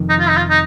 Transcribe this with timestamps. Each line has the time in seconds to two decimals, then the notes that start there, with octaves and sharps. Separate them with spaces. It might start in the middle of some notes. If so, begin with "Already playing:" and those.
Already playing: F1 F2 D#3
0.09 D#4
0.20 F4
0.29 D#4
0.37 F4
0.50 D#4